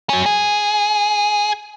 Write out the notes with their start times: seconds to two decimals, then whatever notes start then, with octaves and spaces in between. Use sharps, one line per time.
0.09 F#3 C#4
0.26 G#4